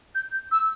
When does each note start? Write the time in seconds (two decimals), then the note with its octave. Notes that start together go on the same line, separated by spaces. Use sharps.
0.15 G6
0.52 E6